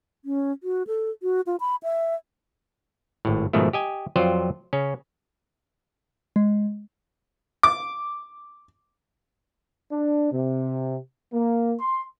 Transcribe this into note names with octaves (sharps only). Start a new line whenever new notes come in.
C#4
F#4
A4
F#4
F4
B5
E5
G#1 A2
G#2 B2 D#3 F3 A3
G4 D#5 G#5
F2 F#3 F4 C5 D5 G5
C#3 C#4
G#3
D6
D4
C3
A#3
C6